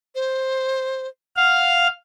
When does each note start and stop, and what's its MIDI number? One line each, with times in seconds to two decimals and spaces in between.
0.15 1.07 72
1.36 1.87 77
1.36 1.88 78